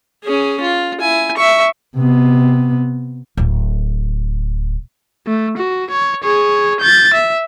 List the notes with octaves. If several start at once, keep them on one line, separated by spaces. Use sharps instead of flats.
C#4 G#4
F4
E4 G#5
E5 C#6
C3 B3
D1
A3
F#4
C#5
G#4 C#5
G6 A6
E5